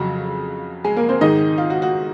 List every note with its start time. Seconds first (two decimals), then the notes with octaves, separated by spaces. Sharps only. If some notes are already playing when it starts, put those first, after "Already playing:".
Already playing: F2 C#3 F#3 F#4
0.84 G#3 G#4
0.96 A#3 A#4
1.09 C4 C5
1.21 G#2 D#3 G#3 D#4 D#5
1.58 F4
1.70 F#4
1.82 F#4